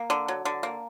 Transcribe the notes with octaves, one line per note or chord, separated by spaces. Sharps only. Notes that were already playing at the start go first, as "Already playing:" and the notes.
Already playing: A#3
D3
F#3
D3
A#3